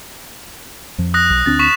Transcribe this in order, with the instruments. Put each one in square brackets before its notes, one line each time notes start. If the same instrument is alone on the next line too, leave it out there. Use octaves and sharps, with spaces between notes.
[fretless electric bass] F2 F3
[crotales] D#6 F#6 A#6
[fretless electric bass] B1
[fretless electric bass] D2 C4 D4 [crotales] A6
[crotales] C#6 B6 E7